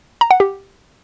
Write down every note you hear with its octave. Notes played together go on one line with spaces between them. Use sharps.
A#5
F#5
G4